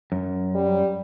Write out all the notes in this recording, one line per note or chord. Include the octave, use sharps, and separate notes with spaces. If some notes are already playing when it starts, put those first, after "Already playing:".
F#2
G3